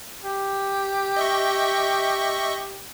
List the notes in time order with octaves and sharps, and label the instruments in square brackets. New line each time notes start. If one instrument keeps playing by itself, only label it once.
[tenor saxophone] G4
[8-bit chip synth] D#5 E5 C#6